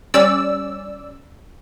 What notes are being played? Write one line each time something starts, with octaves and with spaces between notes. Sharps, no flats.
G3 C#4 D5 E6